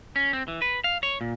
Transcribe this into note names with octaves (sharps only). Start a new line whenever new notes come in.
C#4
C4
E3
B4
F5
C#5
A#2